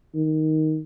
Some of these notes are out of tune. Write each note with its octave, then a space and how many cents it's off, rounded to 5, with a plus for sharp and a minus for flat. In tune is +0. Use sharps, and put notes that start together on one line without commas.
D#3 +5